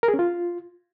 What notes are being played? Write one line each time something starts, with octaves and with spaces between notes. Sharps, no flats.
A#4
G#4
C#4
F4